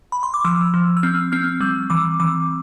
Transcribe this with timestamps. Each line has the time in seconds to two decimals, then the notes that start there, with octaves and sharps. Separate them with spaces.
0.12 B5
0.23 C6
0.34 D6
0.45 F3 E6
0.74 F3
0.97 E6
1.03 C4 F6
1.32 C4 F6
1.61 G3 E6
1.90 E3 D6
2.20 E3 D6